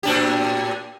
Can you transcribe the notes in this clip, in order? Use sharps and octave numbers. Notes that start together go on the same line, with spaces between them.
A2 D4 G4